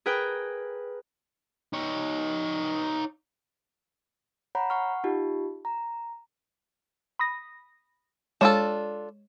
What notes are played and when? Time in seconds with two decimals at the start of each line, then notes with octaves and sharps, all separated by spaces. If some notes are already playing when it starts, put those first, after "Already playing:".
0.06 G#4 A#4 B4 G5
1.73 D#4 C#5
4.55 C#5 F#5 A#5 B5
4.70 F#5 C#6 F6
5.04 D#4 F4 G4
5.65 A#5
7.19 B5 D#6 A#6
8.41 G#3 D4 F4 A4 C#5 E7